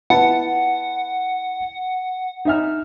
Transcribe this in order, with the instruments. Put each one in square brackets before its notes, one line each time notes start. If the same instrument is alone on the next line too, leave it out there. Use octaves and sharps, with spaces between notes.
[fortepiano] B3 E4 A5 [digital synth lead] F#5
[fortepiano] D#4 E5 F6